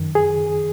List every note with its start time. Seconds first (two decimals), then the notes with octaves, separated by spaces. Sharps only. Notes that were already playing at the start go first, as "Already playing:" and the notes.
Already playing: F#2 D#3
0.15 G#4